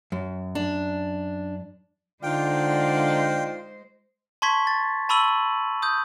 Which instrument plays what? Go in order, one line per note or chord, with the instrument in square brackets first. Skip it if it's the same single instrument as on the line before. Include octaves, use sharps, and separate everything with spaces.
[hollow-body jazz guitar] F#2
[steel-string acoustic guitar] D4
[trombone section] D3 [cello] G#3 C5 [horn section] D#4 F4 D5 [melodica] G5
[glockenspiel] A5 C6 C#6 G#6 B6
A6
A5 B5 C#6 E6 D#7 F#7
D#6 G6